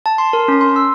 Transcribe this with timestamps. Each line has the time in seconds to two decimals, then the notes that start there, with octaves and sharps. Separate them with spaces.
0.06 A5
0.18 C6
0.33 A#4
0.48 C#4
0.61 C6
0.76 E6